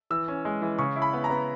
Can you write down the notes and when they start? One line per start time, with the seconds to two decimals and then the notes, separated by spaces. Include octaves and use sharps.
0.10 E3 E6
0.28 C#4
0.45 G#3
0.62 E3
0.78 C#3 C#6
0.96 E4
1.02 B5
1.13 B3
1.24 A#5
1.30 B3